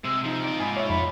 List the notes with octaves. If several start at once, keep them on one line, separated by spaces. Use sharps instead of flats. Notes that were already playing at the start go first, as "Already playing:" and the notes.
C3 G#3 C5 E6
F3 D#4
F4 D5
G#2 G#5 B5
C#5 E5
F2 B5